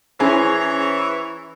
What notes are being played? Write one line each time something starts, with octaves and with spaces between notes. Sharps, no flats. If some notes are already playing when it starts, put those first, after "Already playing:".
E3 C#4 E4 G#4 C5 C#5 G#5 A#5